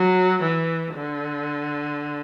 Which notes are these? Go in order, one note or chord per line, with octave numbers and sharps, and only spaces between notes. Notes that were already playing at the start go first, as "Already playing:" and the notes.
Already playing: F#3
E3
D3